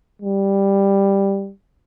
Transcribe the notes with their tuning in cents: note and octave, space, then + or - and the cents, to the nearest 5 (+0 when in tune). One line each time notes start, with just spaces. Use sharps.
G3 +5